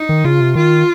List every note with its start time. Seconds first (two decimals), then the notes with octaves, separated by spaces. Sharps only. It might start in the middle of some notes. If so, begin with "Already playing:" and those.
Already playing: D#4
0.09 D#3
0.25 C#3 F4
0.40 C3
0.55 D#3 F4